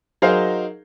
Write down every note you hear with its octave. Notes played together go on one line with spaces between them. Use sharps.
F#3 D#4 G#4 A#4 C5 F5